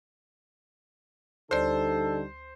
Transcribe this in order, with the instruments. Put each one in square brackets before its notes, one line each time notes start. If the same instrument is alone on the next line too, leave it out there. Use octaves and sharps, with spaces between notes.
[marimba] D2 D5 [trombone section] D3 G3 D#4 [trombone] A4 [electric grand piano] C5